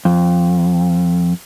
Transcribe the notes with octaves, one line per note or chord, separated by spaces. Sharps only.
F2